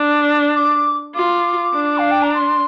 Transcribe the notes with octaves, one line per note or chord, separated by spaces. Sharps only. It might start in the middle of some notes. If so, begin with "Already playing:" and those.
Already playing: D4
D6
F4 D6
D4
F5
G5
A#5
C6